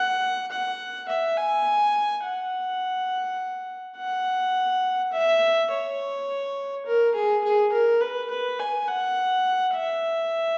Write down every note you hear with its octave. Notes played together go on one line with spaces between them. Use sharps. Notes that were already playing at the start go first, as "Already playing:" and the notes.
Already playing: F#5
F#5
E5
G#5
F#5
F#5
E5
C#5
A#4
G#4
G#4
A#4
B4
B4
G#5
F#5
E5